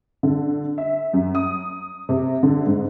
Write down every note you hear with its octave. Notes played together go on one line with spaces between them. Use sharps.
D3
E5
F#2
D#6
C3
D3
G#2